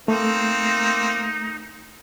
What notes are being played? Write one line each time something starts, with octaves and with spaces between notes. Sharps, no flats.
A3 A#3 C4 D#4